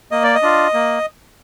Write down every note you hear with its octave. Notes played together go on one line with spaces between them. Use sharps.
A#3 D#5
D5
D#5
D4 F4
A#3